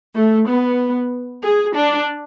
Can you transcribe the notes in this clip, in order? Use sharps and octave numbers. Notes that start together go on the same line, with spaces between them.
A3
B3
G#4
D4